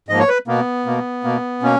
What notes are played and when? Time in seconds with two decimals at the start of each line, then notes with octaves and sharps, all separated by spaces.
0.09 G#2 F3 A#3 D#5
0.19 C#5
0.28 B4
0.47 B2 A#3 B3
0.86 B2 A#3
1.24 B2 A#3
1.62 B2 A#3 C#4